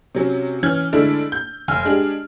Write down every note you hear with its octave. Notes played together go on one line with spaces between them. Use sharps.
C3 F#3 C#4
E3 C#4 F6 G#6
D3 G#3 A3 D4 E4
G6
F1 G#5 F6
G#3 D4 G4 G#4